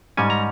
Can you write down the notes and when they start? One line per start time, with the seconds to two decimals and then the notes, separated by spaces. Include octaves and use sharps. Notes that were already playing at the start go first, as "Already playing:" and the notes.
0.17 G#2 G3 C#4 G#5
0.30 A#5